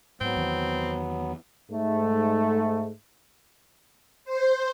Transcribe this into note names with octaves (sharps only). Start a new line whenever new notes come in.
G#2 F#3 B3 C4
E2 D#3 E3
G#2 A3
C5